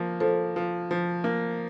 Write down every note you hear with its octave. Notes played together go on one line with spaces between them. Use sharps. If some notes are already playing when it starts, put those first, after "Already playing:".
Already playing: F3 A#3
F3 A4 C5
F3
F3
A#3